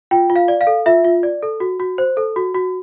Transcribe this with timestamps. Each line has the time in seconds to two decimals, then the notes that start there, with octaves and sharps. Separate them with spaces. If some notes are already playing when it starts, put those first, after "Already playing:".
0.11 F4 G5
0.30 F4
0.36 F5
0.48 D5
0.61 F5
0.67 A4
0.86 F4 E5
1.05 F4
1.23 D5
1.42 A4
1.60 F#4
1.80 F#4
1.98 C5
2.17 A4
2.36 F#4
2.54 F#4